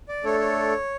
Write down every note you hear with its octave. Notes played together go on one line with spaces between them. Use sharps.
D5
A3 D4 A4 C#5
C#5